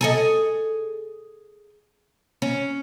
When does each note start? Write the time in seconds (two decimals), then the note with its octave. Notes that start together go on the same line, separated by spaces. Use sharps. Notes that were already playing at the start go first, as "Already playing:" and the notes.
0.01 G#4 A4 D#5
2.42 C#4